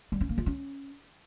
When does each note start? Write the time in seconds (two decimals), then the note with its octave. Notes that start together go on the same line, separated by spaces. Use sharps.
0.12 G3
0.21 C#4
0.29 A#3
0.38 F4
0.46 C#4